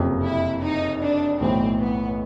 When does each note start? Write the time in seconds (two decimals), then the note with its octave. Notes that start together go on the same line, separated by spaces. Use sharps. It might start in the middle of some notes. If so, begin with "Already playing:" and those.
Already playing: F#1 F2 C3
0.25 E4
0.63 D#4
1.02 D4
1.40 B1 A2 E3 C4
1.79 B3